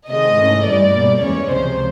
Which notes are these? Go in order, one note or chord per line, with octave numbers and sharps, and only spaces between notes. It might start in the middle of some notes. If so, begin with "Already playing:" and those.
C3 D#3 G#3 C4 D#5
G#2 E3 A3 C#4
G2 E3 G3 D5
B2 G3 A#3
E2 C#3 E3 G#3 C#4 C#5
C#2 C3 F3 C5